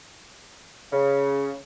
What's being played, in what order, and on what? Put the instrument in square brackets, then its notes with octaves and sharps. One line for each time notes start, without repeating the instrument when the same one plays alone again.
[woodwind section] C#3